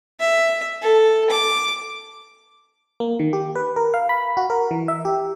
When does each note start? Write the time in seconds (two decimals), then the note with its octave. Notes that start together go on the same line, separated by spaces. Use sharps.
0.20 E5
0.82 A4
1.30 D6
3.00 A#3
3.19 D#3
3.33 G4
3.55 B4
3.76 A#4
3.94 F5
4.09 B5
4.37 F#4
4.50 A#4
4.71 E3
4.88 E5
5.05 G4